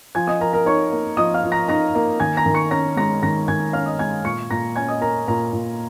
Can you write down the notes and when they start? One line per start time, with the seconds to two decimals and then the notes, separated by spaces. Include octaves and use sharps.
0.15 F3 G#5 G#6
0.27 D#5 D#6
0.41 F3 A#4 A#5
0.53 A#4 A#5
0.66 D#4 C#5 C#6
0.92 A#3
1.17 F3 D#5 D#6
1.34 F5 F6
1.44 F3
1.52 A#5 A#6
1.68 D#4 A#5 A#6
1.95 A#3
2.20 D#3 G#5 G#6
2.37 A#5 A#6
2.46 D#3
2.54 C#6 C#7
2.71 C#4 A#5 A#6
2.96 G#3 A#5 A#6
3.23 D#3 A#5 A#6
3.48 D#3 G#5 G#6
3.73 C#4 F5 F6
3.86 D#5 D#6
3.99 G#3 G#5 G#6
4.25 A#2 C#6 C#7
4.50 A#2 A#5 A#6
4.76 C#4 G#5 G#6
4.88 D#5 D#6
5.01 A#3 A#4 A#5
5.28 A#2 A#4 A#5
5.53 A#2